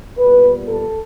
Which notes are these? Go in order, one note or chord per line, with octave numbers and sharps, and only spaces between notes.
A#2 G3 B3 B4
A4